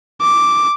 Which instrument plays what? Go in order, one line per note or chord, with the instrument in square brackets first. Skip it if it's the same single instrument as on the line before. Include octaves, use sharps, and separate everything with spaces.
[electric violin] D6